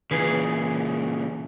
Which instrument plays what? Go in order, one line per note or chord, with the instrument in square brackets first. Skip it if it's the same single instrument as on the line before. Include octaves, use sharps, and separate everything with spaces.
[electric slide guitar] A#2 C#3 [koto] E3 G#4